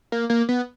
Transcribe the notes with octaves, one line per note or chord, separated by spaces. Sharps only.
A#3
A#3
B3